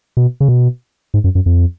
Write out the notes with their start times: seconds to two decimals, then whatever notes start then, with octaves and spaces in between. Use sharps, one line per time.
0.17 B2
0.40 C#3
0.49 B2
1.14 G#2
1.24 F#2
1.35 F#2
1.46 F2